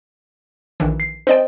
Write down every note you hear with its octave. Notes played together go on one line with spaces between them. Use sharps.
A#1 D#3 E3
C7
C4 C5 D5 D#5 G5